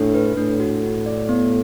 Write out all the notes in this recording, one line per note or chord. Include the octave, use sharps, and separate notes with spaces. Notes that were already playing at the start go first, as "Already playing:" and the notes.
Already playing: A2 D4
B4
A2 D4
F#4
F#4
D5
B3